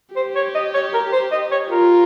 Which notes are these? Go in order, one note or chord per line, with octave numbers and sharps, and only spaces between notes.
G4 C5
C#5
D#5
C#5
A#4
C5
D#5
C#5
F4 A#4